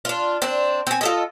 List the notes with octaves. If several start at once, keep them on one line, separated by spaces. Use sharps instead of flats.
D4 F4
C4 D4
C4 G#5
F4 A4 D#5